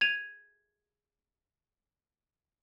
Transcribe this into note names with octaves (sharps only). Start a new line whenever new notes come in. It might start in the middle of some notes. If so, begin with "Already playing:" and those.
G#6 D#7 F7